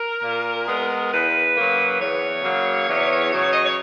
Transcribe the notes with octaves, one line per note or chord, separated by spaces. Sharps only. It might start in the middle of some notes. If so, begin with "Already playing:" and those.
Already playing: A#4
A#2
G#3 B3
E2 B4
C#3 F#3 A#3
E2 C#5
C#3 F#3 A#3
E2
C#3 F#3
D#5
C#5